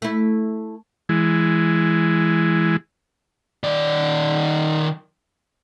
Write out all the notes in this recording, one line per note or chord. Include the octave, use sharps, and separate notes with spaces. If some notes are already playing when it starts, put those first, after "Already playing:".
A3 E4
E3 G#3
D#3 D5